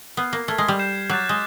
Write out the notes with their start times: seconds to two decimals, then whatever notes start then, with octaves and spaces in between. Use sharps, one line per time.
0.17 B3 F6 G#6 C7
0.33 A#3
0.48 A3 F6 G#6 B6
0.58 G#3
0.68 G3
0.79 G6 C7 E7
1.09 F#3 D6 F#6 A6
1.29 G#3